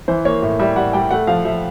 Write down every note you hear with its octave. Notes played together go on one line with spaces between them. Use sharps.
E3 C5
A#3 C#5
A2
G3 E5
G3 F#5
G3 G5
A3 F#5
F3 F5
F3 E5